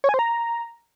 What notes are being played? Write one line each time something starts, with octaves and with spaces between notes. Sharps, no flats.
C#5
G#5
C5
A#5